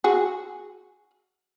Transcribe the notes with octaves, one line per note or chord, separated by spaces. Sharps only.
F#4 G#4